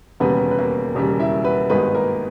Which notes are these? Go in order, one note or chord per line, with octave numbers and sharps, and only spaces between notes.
E1 D#2 C#3 G3 B3 B4
B4
A#3 A#4
E1 D#2 C#3 G3
E4 E5
B3 B4
G#1 G2 D#3 G#3 B3 B4
A#3 A#4